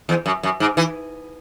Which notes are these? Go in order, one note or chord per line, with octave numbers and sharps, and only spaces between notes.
E2
F#2
F#2
G#2
E3